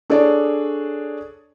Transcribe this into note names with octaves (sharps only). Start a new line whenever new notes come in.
D4 G#4 A4 C#5 D5